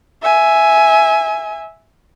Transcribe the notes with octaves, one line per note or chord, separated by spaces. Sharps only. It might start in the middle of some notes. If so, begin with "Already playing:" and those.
E5 G#5